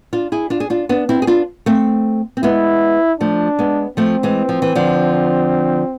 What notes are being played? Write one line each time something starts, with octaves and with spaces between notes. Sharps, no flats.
D4 F4
E4 G#4
D4 F4
G#4
D4 F4
B3 D4
C4 E4
G#4
D4 F4
A3 C4
C4
G#3 B3 E4
F3 A3 D4
G#3 B3
F3 A3 C4
E3 G#3
F3
E3
D3 F3